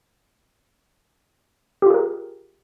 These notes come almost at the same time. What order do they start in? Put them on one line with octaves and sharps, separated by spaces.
G4 F4 G#4 A#4